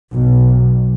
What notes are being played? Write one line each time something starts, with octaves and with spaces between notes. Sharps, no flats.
B1